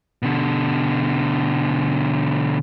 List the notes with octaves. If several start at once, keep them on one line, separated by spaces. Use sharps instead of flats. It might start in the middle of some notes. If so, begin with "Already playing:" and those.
B2 D3